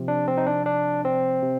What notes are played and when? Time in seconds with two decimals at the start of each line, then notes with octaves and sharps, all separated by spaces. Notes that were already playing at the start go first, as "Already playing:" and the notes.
Already playing: C3 F3
0.08 D4
0.28 C4
0.37 D#4
0.46 D4
0.66 D4
1.05 C4
1.43 C3